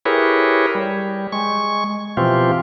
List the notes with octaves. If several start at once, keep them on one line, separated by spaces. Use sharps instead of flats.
E4 G4 G#4 A#4 B4 C#5
G3
G#3 C#6
B2 E3 F3 C4 F4 G4